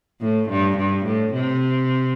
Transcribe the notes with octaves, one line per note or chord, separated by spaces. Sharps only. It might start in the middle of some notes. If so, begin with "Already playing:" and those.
A2
G2
G2
A2
C3